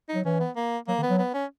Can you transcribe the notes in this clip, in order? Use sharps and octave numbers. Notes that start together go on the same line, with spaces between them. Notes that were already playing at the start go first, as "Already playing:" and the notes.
D#4
F#3
E3 C#4
B3
A#3
F#3 A#3
D#3
B3
F#3
B3
C#4